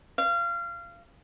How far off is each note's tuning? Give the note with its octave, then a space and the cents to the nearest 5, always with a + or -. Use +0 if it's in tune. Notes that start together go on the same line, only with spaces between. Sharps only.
F5 -25